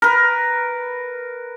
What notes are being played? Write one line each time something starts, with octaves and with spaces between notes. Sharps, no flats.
A#4 B4